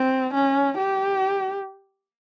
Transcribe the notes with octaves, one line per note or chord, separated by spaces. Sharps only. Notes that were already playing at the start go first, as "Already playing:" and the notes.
Already playing: C4
C#4
G4